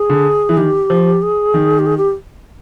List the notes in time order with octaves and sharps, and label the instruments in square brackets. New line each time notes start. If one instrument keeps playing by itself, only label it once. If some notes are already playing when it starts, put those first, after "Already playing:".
Already playing: [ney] G#4
[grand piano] D3
E3
[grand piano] D#3 [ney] G4
[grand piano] F3
[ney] G#4
[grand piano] D#3
[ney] G4
G#4
G4